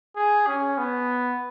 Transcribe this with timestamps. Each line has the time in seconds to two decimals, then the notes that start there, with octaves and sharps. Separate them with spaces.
0.16 G#4
0.47 C#4
0.78 B3